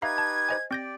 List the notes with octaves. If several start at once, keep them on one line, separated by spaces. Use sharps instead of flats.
D#4 G4 B4 E5 F5 A#5 G#6
A5
C5 D#5 G#5
C4 G4 D5 G5 G6 A#6